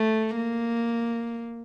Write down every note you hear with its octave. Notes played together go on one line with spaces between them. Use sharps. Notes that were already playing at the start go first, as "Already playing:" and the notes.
Already playing: A3
A#3